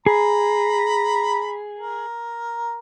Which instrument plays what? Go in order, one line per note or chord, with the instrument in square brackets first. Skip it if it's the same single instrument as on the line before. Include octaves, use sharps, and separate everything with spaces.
[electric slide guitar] G#4 [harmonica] A#5 B5
[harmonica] A#4